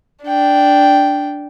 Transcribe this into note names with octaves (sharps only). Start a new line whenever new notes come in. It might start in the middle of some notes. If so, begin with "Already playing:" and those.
D4 G5